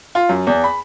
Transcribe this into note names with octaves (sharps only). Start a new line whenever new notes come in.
F4
F#2
E2
B5